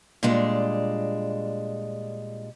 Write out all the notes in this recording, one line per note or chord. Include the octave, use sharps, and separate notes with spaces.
A#2 G3 G#3 D4